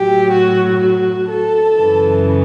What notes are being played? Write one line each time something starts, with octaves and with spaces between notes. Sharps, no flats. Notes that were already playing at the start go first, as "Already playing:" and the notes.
Already playing: A2 F#3 G4
F#4
F#4
A4
F#2 C#3 E3